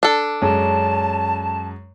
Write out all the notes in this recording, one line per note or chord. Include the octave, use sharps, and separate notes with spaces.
D4 A4
F#2 G#3 C#4 A5